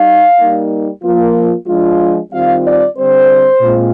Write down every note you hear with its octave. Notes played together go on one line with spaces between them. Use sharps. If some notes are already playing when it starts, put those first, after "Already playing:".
Already playing: G3 D#4 F5
G3 A#3 D#4
F3 A#3 F4
F3 G#3 D4 F4
D#3 G3 C4 F4 F5
D5
D3 G3 C4 C5
A#2 G#3 C4 F4